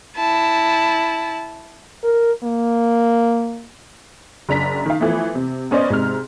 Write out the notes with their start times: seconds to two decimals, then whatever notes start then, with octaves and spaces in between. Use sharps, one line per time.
0.17 E4 A5
2.04 A#4
2.44 A#3
4.49 F#1 D4 A#5 B6
4.86 D#3 F5
5.00 E3 F3 A3 B3
5.35 C3
5.71 B3 C#4 C5 D5 D#5
5.90 G#2 C3 F6